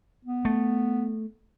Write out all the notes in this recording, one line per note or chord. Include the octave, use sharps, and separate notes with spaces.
B3
A3